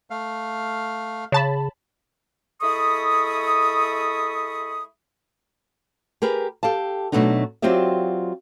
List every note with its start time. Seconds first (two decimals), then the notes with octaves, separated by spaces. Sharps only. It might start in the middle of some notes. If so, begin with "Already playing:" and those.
0.10 A3 F5
1.32 C#3 C#5 A5 B5
2.62 G#3 E4 A4 B5 C#6 D#6
6.22 G4 G#4 A#4 B4
6.63 G4 A4 F5 A5
7.12 B2 F#3 A3 B3 D4 D#4
7.62 F#3 C4 F4 G4 D5 E5